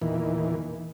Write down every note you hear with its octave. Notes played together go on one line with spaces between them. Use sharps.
E2 A#2 D#3 E3